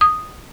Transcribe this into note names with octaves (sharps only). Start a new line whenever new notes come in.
D#6